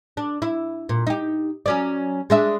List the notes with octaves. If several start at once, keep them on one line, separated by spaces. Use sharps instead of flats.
D4
E4
A#2
D#4 G4
F#3 C#4 D5
G#3 D4 E5